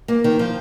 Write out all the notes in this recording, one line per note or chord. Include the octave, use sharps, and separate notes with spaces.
A#3
D#3
F3